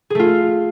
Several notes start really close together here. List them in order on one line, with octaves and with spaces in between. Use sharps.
G#4 A3 F4